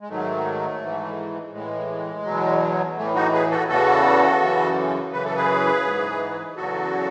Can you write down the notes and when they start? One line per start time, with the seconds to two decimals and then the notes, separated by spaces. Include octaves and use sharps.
0.01 G#3
0.09 G#2 D#3 F#3 A3
0.81 G#2 E3
1.53 A2 E3 G#3
2.25 E2 B2 F#3
2.97 A2 E3 A3
3.15 D#4 F#4
3.33 G#4 B4
3.51 F#4 A4
3.69 E2 C#3 E3 F#4 A4
4.41 F#2 C#3 E3
5.13 F#2 C#3 E3 B4
5.25 A4
5.36 G#4 B4
5.85 G#2 E3
6.56 E2 C#3 F#3 F#4 A4